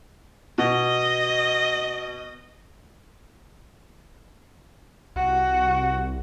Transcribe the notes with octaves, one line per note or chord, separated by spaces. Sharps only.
B2 D#5
C2 F#4